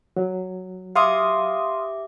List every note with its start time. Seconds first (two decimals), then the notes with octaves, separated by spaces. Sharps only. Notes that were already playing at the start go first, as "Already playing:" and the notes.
0.17 F#3
0.95 G4 E5 F5 C6 D6 D#6